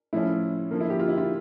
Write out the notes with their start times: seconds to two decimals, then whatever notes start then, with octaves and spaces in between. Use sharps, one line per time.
0.13 A2 F3 C#4 E4
0.71 D3 F3 A#3
0.80 E4
0.90 G4
0.99 F4
1.08 E4
1.18 F4